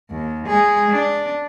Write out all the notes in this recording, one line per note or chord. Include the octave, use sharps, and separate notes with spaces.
D#2
G#3 G#4
D4